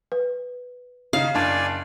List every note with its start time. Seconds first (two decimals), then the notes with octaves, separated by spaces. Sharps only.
0.12 B4
1.13 C#3 D#4 F5
1.35 F#1 D4 D5 G#5